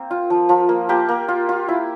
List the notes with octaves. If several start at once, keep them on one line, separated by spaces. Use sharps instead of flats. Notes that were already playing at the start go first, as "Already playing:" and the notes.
Already playing: A#3 C4
F4
F3
F3
A#3
A#3 G4
A#3
F4
F4
E4